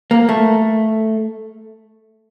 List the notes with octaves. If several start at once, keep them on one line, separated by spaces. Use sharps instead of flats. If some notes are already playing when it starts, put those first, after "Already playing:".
A#3
A3